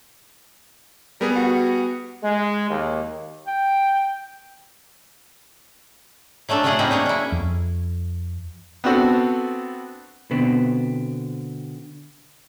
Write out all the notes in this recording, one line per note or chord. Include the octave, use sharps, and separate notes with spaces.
G3 B3 G#4 A#4
F#4
G#3
D#2
G5
F#3 A3 C#4 D4 A4
A2 C#3 F#3 A3 G#4 F#5
F#3 G3 A#3 C4 D#4
D4 G#4 C#5
C#4 E4
F2
B3 C4 D4 F#4 A4
B2 D3 B3 C4